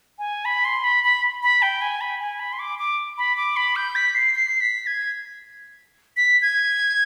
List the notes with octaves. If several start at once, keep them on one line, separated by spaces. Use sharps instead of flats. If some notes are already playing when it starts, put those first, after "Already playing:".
G#5
B5
C6
B5
B5
B5
G5
G#5
B5
G#5
B5
C6
D6
D6
B5
D6
B5
G6
B6
C7
C7
B6
G#6
B6
G#6